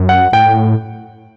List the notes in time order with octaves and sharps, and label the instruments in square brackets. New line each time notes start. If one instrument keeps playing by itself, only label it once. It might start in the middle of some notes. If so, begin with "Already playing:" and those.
Already playing: [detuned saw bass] F#2
[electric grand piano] F#5
[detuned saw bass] A2 [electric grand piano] G5